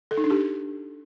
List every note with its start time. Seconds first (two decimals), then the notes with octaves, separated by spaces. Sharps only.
0.11 A4
0.17 D#4
0.24 D4
0.31 G4